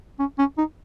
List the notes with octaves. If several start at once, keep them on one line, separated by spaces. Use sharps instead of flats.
C#4
C#4
D#4